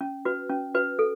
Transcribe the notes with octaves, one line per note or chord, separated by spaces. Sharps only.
C#4
F#4 B4
C#4
F#4 B4
A4